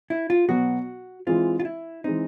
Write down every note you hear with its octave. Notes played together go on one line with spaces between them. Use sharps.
E4
F4
B2 F#3 B3 F#4
E3 G#3 C4 F4
F4
E4
E3 G#3 C4 D#4